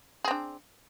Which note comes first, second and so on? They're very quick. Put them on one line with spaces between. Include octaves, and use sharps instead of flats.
G#4 C4 D4